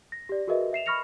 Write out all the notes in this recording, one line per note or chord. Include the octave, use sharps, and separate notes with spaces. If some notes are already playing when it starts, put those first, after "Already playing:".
A#6
G4 D5
F#4 G#4 A#4 B4 D#5 E5
E5 C7 E7 F7
B5 C#6 F6 A#6 C#7 F7